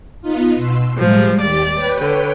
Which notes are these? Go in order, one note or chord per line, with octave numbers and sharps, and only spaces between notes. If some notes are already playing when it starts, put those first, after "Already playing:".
B3 D#4 F4
B2 C6 E6
A2 F3 G3 G#3
D#2 G4 D5 A6
B4 C#5 G5
D3